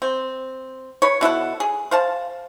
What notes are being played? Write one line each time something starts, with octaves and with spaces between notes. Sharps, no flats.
C4
B4 C#5
B2 E4 A4 F#5
G#4
C5 F5 A5